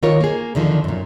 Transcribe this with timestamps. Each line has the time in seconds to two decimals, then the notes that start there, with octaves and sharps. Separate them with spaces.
0.03 D#3 F4 A#4 C#5
0.21 A#3 G#4
0.55 E2 D3 D#3 F3
0.84 F#2 A#2